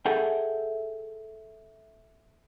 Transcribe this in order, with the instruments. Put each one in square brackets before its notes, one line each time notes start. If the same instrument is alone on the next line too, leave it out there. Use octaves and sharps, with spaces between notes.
[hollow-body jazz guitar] G#4 A4 E5 F#5 G5